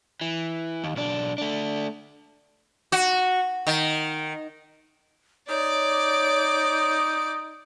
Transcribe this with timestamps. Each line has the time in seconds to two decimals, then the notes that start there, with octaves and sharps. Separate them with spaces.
0.21 E3
0.84 D#2
0.96 B1 D4
1.38 A3 D4
2.92 F#4
3.67 D#3
5.49 D#4 C#5 D5 D6